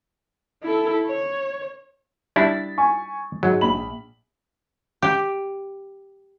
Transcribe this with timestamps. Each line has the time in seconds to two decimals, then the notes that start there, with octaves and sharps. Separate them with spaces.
0.63 E4 A4
1.07 C#5
2.36 G3 D4 E4 A6 B6
2.78 G#5 C#6
3.43 G#2 F#3
3.61 A#1 B5 F#7
5.02 G4